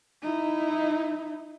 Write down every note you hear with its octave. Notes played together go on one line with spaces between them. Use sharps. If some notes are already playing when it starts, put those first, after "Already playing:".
D#4 E4